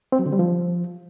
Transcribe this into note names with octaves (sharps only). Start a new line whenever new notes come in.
C4
F#3
D3
G3
F3